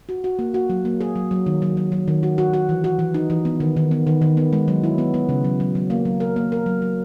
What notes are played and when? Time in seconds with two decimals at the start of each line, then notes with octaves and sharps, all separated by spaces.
0.09 F#4
0.24 F#4
0.39 A#3
0.54 F#4
0.70 F#3
0.85 A#3
1.00 G#4
1.16 F#3
1.31 F#3
1.46 D#3
1.62 F#3
1.77 F#3
1.92 F#3
2.08 D#3
2.23 F#4
2.38 F#4
2.54 F#4
2.69 E3
2.84 F#4
2.99 E3
3.14 D#4
3.30 E3
3.45 B3
3.60 D#3
3.77 D#3
3.91 B3
4.07 D#3
4.22 D#3
4.37 B3
4.53 G#3
4.68 F#3
4.84 E4
4.98 B3
5.14 B3
5.29 C#3
5.44 F#3
5.60 F#3
5.75 F#3
5.90 A#3
6.05 F#3
6.20 A#4
6.36 A#3
6.52 A#4
6.66 F#3
6.82 F#3